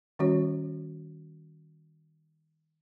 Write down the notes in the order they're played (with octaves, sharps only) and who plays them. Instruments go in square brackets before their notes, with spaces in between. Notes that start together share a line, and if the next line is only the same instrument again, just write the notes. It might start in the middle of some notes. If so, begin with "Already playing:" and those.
[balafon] D#3 G3 C#4 F#4 C#5